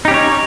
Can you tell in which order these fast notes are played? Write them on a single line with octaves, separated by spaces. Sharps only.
D#4 G4 C#4 C#5